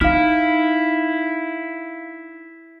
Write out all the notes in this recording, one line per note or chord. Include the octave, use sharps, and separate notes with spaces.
D#4 E4 F5 F6